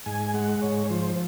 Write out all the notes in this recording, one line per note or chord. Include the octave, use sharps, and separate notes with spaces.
G#2 G#5
G#3 F#5
G#2 C#5
F3 C5